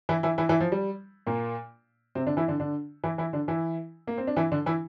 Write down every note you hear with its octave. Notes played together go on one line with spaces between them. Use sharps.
E3 E4
E3 E4
E3 E4
E3 E4
F3
G3
A#2 A#3
C3 C4
D3 D4
E3 E4
D3 D4
D3 D4
E3 E4
E3 E4
D3 D4
E3 E4
A#3
C4
D4
E3 E4
D3 D4
E3 E4